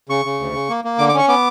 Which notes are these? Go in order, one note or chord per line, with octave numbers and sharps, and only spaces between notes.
C#3 C#6
C#3
D2
C#3
A#3
A#3
D3 D6
D6
C#4 C#6
B3 D6